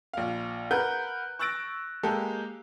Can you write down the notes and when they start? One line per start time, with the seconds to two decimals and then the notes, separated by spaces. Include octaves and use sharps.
0.13 A#1 F5
0.71 A#4 B4 F#5 F#6 G6
1.39 C#6 E6 F#6 A6 A#6 D7
2.03 G#3 A#3 G4 A4